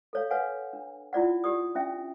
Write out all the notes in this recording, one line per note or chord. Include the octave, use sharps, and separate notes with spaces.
A4 C#5 F5
B4 C#5 F5 F#5 G#5
D4
E4 F4 D5 F#5
G4 D5 D#6
C#4 D4 E5 G5